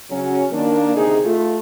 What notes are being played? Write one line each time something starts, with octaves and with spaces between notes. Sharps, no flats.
C#3 F#3 C#4
D#3 A#3 D4
D2 C3 D#4 G#4
A3 F4